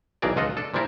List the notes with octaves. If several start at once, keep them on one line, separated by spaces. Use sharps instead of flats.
B1 B2 E3 G#4 A#4 D5
C#2 F4 A4 D#5 F#5
D4 A4
A#2 F3 G3 D4 E4 A#4